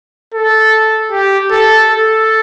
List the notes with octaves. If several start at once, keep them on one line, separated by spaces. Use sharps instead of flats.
A4
G4
A4
A4